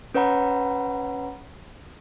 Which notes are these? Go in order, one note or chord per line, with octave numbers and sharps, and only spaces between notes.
C#4 B4 C#5 F#5 A#5 B5